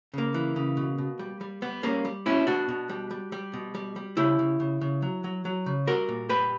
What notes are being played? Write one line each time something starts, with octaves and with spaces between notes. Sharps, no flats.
C#3 A#3
E3
C#3
B2
B2
G3
G3
G3 B3
G3 A#3 C#4
G3
B2 C#4 E4
B2 D4 F#4
B2
G3
G3
G3
B2
G3
G3
C#3 E4 G4
C#3
C#3
C#3
F#3
F#3
F#3
C#3
G3 F#4 A#4
A#2
G3 G4 B4